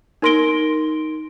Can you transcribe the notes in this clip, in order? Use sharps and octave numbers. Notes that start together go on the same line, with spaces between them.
D#4 A#4 C6 A#6 D7 G7